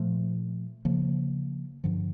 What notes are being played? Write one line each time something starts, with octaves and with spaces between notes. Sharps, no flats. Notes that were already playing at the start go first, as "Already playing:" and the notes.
Already playing: A#2 F3 A3
C#3 F3 A#3
G2 D3 F3